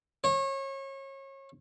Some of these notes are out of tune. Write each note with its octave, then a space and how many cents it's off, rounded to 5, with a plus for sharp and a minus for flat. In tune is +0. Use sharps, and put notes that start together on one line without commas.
C#5 -30